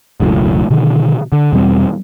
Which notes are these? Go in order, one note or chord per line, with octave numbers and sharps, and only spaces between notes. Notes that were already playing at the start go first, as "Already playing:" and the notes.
E1 C#2 F#2 A2
B2 D3 D#3
D3
E2 B2 G3 C4